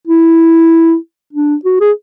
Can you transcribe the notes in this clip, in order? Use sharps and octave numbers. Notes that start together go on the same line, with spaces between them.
E4
D4
F#4
G#4